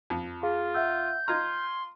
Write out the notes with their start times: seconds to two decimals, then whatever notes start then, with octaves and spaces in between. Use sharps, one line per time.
0.10 F2
0.43 F4 G#4 F5
0.75 E5 F#5 E6 G6
1.28 F4 D#5 A#5 C6 F6 G#6